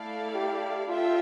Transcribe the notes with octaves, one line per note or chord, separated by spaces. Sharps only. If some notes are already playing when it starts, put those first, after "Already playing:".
Already playing: A3 E4 A4 D5 F5
G4
D4 F4 A4 E5 G5